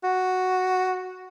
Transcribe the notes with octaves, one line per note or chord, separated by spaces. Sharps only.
F#4